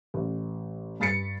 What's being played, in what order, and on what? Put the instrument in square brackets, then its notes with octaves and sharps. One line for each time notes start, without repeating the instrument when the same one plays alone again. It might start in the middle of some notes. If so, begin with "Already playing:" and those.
[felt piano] A1
G2 B5 A6 C7 C#7